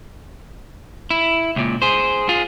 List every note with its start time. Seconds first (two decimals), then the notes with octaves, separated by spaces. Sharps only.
1.10 E4
1.56 C#2 A#2
1.82 G#4 C5
2.29 F4 G#4